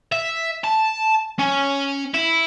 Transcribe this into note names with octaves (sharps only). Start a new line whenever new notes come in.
E5
A5
C#4
E4